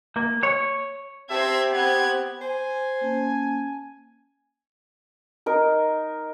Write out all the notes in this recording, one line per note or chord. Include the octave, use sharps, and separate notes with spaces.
A#3
C#5
C4 G4 E5 A5 G#6
B3 C4 F#6 G#6
C5 G#5
A#3 C#4 A5
D#4 A#4